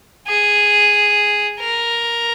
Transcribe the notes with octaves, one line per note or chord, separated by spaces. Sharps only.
G#4
A#4